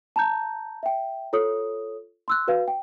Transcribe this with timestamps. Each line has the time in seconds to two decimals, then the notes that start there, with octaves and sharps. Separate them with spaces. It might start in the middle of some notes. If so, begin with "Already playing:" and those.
0.16 A5 A#5 G6
0.83 E5 G5
1.33 F4 A4 C#5 D#6
2.28 C6 E6 F#6
2.48 F#4 B4 F5
2.68 G5